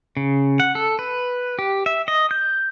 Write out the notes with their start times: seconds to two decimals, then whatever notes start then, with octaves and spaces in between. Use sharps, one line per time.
0.17 C#3
0.60 F#5
0.75 A4
0.99 B4
1.59 G4
1.86 E5
2.08 D#5
2.31 G6